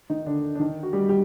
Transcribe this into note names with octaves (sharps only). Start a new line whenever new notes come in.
D#3 D#4
D3 D4
D4
D#3 D#4
F#4
G3 G4
G3 G4